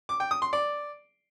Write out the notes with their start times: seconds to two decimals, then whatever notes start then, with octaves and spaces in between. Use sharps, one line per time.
0.09 D6
0.20 G5
0.31 D#6
0.42 C6
0.53 D5